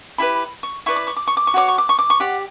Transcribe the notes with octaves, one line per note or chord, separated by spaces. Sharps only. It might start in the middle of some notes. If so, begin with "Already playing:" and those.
E4 G4 B4 B5
C#6
E4 B4 D5 C#6
D6
C#6
D6
C#6
D6
C#6
F#4 C#5 D6
C#6
D6
C#6
D6
C#6
G4 D5 F#5